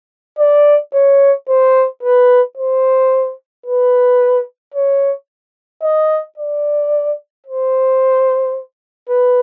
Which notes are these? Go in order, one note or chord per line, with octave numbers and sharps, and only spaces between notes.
D5
C#5
C5
B4
C5
B4
C#5
D#5
D5
C5
B4